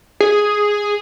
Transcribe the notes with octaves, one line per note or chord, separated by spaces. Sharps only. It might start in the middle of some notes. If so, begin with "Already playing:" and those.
G#4